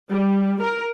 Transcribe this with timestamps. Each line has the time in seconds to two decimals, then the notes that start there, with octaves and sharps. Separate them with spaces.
0.11 G3
0.62 A#4